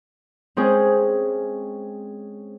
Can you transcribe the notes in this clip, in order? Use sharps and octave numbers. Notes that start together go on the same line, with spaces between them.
G#3 C4 C#4 G#4